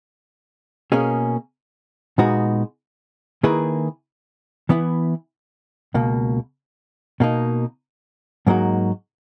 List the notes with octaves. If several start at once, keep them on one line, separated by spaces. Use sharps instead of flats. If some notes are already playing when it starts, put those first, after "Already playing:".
B2 A#3 C#4 G#4
A#2 G#3 B3 D#4 F#4
D#3 A#3 E4 G#4 B4
E3 B3 E4
C#2 B2 A#3
B2 A#3 D#4
G#2 F#3 A#3 D#4 F#4